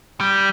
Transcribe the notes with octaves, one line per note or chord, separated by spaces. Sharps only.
G3